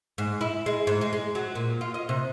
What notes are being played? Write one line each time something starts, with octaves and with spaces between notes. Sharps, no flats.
G#2
E4
G#3
G#2
G#3
G#3
F#3
A#2
F4
D#5
C3